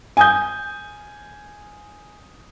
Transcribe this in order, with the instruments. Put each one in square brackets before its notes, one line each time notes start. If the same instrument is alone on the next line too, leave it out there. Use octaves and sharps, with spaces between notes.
[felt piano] G#5 D#6 G6